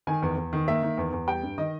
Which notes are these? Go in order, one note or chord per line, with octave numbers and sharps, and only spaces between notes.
D#3 G#5
E2
E2
D#3
A#3 E5
D#3
E2
E2
G3 G5
G2
D#3 D#5